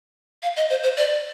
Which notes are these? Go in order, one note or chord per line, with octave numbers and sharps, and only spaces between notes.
F5
D#5
C5
C5
D5